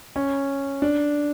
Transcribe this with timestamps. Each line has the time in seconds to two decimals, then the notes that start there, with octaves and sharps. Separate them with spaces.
0.16 C#4
0.82 D4